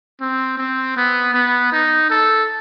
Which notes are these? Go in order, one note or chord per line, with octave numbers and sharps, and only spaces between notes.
C4
C4
B3
B3
D#4
A4